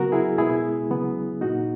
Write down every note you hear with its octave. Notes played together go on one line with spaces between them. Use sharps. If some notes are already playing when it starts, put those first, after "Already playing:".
Already playing: C#3 F#3 B3 F#4 A#4
E4 G#4
B2 G#3 B3 E4 G#4
C#3 F#3 B3
A#2 A#3 D#4 F#4